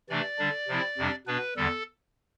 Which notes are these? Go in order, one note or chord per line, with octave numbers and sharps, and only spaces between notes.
C3 E3 A3 D4 D5
D3 G3 D4
C3 F3 C4 E4
F2 C3 G3 D4
B2 B3 D4 B4
E2 D3 G3 A4